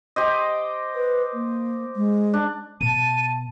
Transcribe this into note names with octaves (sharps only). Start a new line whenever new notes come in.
G4 C5 D#5
B4
A#3
G#3
D4
B2 A5 D#7